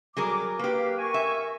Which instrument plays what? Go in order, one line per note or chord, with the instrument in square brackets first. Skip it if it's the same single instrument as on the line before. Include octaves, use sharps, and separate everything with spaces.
[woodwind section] D#3 G3 D6 [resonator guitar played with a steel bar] F#3 G#4 A#4
[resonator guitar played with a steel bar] A#3 G4 [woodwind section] B4 F5
[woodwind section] A#4 G#5 C#6
[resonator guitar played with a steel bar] E5